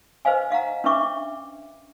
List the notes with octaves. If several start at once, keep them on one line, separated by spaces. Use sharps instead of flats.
B4 C5 D#5 F5 G#5
D#5 F5 F#5 A#5
C#4 D4 B4 E5 C#6 D6